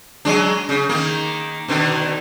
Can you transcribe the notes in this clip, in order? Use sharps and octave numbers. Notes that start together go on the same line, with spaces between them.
F#3 G#3 D4
C#3
D#3 A#3
B2 D3 D#3